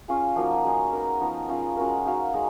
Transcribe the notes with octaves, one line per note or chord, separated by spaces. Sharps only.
C#4 F4 G#4
F3 A#3 D#4 F#4
G#3 D#4 G#4
B3 D#4 A#4
F3 B3 D#4 A#4
C#4 F4 G#4 D#5
G#3 C#4 F#4 A#4
D#4 F#4 C#5 F5
G#3 D#4